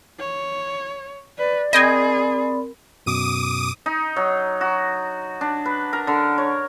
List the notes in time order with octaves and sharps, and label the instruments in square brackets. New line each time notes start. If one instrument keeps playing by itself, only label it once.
[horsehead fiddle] C#5
[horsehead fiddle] B4 [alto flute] D5
[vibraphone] C4 A#4 B5 [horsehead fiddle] G#4 [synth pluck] D#5 G5 G#5
[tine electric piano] F#2 B2 [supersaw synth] D6 D#6 D#7
[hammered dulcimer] D#4
F#3
F#4
D4
B4
A#4
D3
C#5